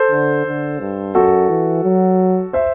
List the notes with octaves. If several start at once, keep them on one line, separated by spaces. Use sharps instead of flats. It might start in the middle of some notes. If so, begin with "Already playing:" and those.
Already playing: A4 C5
D3
D3
G2
F#2 F#4 A4
E3
F#3
C5 E5